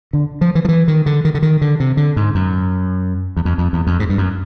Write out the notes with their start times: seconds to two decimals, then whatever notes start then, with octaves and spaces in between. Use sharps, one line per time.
0.13 D3
0.41 F3
0.55 E3
0.65 F3
0.69 E3
0.88 D#3
1.06 D3
1.25 D#3
1.35 D3
1.42 D#3
1.61 D3
1.80 C3
1.97 D3
2.17 G#2
2.35 F#2
3.37 E2
3.45 F2
3.58 F2
3.73 E2
3.87 F2
4.00 G#2
4.09 G2
4.18 F#2